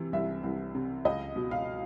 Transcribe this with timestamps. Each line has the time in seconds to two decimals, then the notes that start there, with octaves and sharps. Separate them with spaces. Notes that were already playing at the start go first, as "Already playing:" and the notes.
Already playing: C3 E3
0.13 C2 E5
0.43 C2
0.75 C3
1.05 C#2 D#5
1.36 B2
1.51 F5